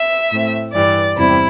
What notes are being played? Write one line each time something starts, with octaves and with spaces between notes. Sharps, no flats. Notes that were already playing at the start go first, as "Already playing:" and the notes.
Already playing: E5
A2 A3 C4
G2 E3 G3 D5
E2 C3 G3 C4 E4